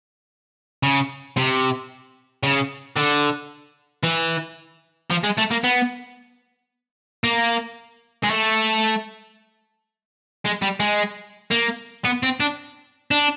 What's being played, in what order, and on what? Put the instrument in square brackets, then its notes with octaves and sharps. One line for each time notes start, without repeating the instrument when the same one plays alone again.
[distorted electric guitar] C#3
C3
C#3
D3
E3
F3
G#3
A3
A#3
B3
A#3
G#3
A3
G#3
G3
G#3
A#3
B3
C4
D4
D4